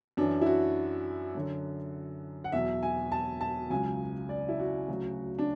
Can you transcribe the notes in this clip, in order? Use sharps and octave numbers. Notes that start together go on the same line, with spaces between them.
F#2 E3 D4
E4
F#4
F#2 D3 F#3
F#5
E2 B2 F#3 E5
G#5
A5
A5
C#2 C#3 F#3 G#5
D5
E4
F#4
D2 C#3 F#3
D4